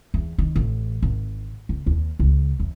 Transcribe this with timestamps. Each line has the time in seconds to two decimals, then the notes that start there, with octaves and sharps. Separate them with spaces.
0.14 E2
0.38 D#3
0.56 A1
1.02 G#1
1.69 F#1
1.86 D#2
2.19 C#2
2.60 E2